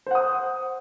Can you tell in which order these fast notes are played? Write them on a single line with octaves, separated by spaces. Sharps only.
C5 F#5 D#6